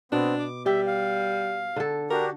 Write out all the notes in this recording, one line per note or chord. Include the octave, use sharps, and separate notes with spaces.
B2 B3 C4 D4
D6
G3 G4 E5
F5
D3 A4
D4 F#4 G4 A#4